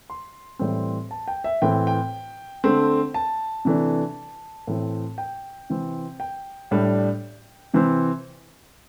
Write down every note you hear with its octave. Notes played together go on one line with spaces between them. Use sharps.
C6
A2 E3 G3 C4
A5
G5
E5
A2 E3 C4 G5
G5
D3 A3 C4
A5
C3 E3 A3 D4
A2 E3 C4
G5
C3 E3 C4
G5
A2 G3 D4
C3 E3 C4